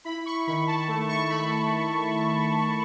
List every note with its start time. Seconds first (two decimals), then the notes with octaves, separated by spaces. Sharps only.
0.05 E4 B5
0.26 C#6
0.46 D#3 B5
0.67 A5
0.88 A3
1.09 C#6
1.30 A3 B5